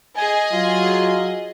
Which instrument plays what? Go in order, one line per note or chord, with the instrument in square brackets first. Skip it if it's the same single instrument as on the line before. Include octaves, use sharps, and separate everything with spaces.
[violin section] G#4 D#5 [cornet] G#5
[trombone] F#3 [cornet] F4